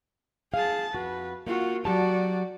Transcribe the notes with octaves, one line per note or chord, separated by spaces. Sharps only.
G#4 F5 A5
F2 F#4 B4
A#3 F4 F#4
F#3 F#4 G4 D5 A5